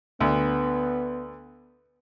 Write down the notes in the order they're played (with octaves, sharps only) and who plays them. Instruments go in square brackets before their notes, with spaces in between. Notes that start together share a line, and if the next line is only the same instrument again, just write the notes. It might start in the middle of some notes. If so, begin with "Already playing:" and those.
[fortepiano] D2 [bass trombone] B3